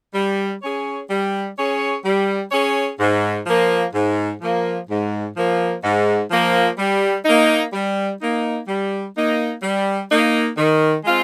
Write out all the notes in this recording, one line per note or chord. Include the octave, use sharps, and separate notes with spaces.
G3
C#4 G#4 C#5
G3
C#4 G#4 C#5
G3
C#4 G#4 C#5
G#2
F3 A#3
G#2
F3 A#3
G#2
F3 A#3
G#2
F3 A#3
G3
A#3 D#4
G3
A#3 D#4
G3
A#3 D#4
G3
A#3 D#4
D#3
G#3 C4 F4